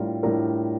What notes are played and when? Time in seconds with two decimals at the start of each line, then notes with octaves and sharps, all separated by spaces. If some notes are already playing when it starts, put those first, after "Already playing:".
Already playing: A2 G3 D4 F4 A#4
0.23 A2 G3 D4 F4 A#4